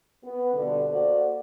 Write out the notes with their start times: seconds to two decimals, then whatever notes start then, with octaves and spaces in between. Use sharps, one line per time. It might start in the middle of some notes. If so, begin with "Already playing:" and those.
0.24 B3
0.54 G2 B2 D3
0.90 A#3 F#4 A4 C5 D5